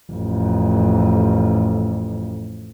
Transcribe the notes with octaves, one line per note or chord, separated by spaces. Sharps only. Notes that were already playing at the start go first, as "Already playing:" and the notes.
A1 F2